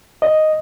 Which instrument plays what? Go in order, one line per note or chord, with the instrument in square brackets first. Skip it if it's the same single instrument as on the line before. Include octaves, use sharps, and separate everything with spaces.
[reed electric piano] D#5